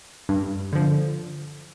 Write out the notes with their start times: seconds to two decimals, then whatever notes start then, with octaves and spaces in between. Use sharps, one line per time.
0.29 G2
0.73 D3 F3